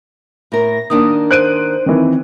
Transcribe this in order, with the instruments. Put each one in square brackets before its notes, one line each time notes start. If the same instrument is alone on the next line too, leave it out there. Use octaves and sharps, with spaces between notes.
[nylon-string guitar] A2 A#4 [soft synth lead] A#6
[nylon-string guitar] D#3 A#3 D4 [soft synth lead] D#6
[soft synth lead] C5 [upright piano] F#6 D7 D#7
[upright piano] D#3 E3 [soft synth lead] C4